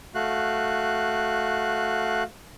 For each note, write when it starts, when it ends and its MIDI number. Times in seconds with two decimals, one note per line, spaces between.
0.15 2.23 57
0.15 2.23 66
0.15 2.23 77
0.15 2.23 90